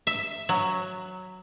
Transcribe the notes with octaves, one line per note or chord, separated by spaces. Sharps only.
E5
F#3